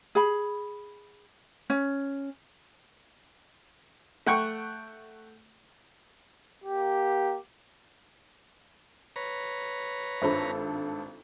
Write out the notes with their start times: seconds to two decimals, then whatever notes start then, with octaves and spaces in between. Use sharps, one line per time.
0.15 G#4 B5
1.70 C#4
4.27 A3 F#5 G5 C#6
6.65 A#3 G4
9.16 B4 C#5 A#5
10.22 G#1 G2 F4 A4 C5 E5